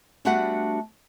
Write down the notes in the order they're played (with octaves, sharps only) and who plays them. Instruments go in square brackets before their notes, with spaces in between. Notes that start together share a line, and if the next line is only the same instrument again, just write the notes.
[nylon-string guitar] G3 A3 B3 D4 F#4 F#5